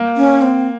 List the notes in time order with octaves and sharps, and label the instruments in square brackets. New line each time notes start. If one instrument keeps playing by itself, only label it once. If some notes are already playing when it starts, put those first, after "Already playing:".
Already playing: [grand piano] A#3
[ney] C#4
C4